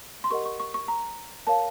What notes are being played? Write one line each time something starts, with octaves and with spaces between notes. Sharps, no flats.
C6
G4 A#4 D#5 F#5 C#6
C#6
C#6
C#6
A#5
A#4 C#5 F5 A5